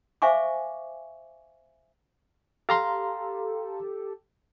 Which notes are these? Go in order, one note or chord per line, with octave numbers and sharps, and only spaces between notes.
C5 E5 F5 G#5 C#6 D6
G4 A4 F5 A#5 C6